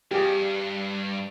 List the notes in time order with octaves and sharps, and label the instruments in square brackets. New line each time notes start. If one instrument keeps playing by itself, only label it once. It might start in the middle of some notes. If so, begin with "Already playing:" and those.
[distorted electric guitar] G2 [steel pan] G4 G#4